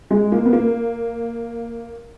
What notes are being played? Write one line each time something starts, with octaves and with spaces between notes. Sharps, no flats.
G#3
A#3
B3
A#3